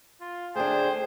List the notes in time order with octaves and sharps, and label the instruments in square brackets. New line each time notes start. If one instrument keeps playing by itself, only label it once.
[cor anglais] F4
[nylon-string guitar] D2 D4 [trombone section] A3 G#4 [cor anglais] C5 [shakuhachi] G5